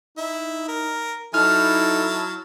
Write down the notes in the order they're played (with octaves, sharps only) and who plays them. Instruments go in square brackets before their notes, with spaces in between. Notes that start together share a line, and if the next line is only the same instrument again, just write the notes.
[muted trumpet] D#4 [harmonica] E4
[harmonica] A#4
[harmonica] F#3 A5 [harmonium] D#4 A4 [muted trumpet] E4 [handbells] F6